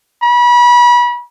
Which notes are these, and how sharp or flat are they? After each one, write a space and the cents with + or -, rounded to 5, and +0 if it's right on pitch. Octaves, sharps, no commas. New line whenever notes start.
B5 -30